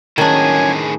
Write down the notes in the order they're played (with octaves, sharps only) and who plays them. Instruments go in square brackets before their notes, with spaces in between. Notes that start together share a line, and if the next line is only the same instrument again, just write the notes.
[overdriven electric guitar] A2 G#4 [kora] D#3 D4 [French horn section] F#3 A#3 C#4 [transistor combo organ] G#5